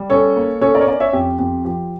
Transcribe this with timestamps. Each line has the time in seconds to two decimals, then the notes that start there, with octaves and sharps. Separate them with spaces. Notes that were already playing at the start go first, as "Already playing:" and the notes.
Already playing: G3
0.10 C#4 A4 C#5
0.36 A#3
0.61 C#4 A4 C#5
0.75 A#4 D5
0.81 C#5
0.87 C#4 A#4 D5
1.00 C#5 E5
1.13 F2 G4
1.39 F2 G4
1.65 F3 G4